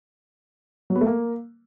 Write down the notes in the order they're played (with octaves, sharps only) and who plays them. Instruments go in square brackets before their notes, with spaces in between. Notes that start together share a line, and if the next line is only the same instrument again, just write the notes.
[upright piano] F#3
B3
A3
A#3